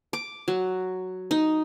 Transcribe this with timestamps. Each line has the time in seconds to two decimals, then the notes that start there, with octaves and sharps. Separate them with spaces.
0.13 D6
0.48 F#3
1.31 D#4